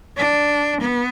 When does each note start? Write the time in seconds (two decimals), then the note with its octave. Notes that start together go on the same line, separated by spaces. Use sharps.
0.17 D4
0.81 B3